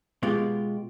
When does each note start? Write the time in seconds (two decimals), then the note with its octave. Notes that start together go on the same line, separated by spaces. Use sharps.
0.23 B2 G#3 B3 F4 G4